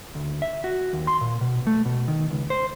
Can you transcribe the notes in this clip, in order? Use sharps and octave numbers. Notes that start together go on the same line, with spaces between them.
D2
E5
F#4
D#2
C6
A#2
B2
A3
B2
D#3
C#2
C5